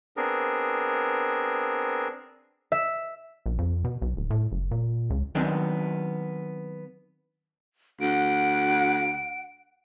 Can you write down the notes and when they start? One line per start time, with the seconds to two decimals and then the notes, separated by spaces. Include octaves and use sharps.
0.17 B3 C4 D4 G#4 A#4
2.72 E5
3.46 A#1
3.58 F2
3.84 B2
4.02 B1
4.17 D1
4.30 A2
4.52 F#1
4.71 A#2
5.10 C#2
5.35 D#3 F#3 B3 C4 D4
8.01 D2 F#5 D7